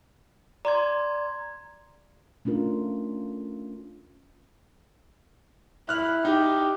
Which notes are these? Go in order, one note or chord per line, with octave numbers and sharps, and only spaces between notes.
D5 A#5 C6 G#6
A3 C#4 D4 F4 A#4
E4 F6 F#6
D#4 G4